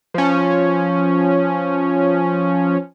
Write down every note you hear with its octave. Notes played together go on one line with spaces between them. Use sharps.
F3 C#4